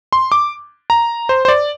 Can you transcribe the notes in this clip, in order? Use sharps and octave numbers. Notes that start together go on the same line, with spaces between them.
C6
D6
A#5
C5
C5
D5